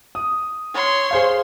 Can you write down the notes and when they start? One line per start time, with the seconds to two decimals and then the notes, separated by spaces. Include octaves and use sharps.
0.15 D#6
0.75 C#5 C6
1.11 G#4 C5 F5